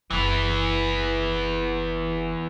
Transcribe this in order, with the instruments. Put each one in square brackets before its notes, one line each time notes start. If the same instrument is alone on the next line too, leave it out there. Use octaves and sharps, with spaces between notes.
[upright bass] F#1 [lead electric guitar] E3 B3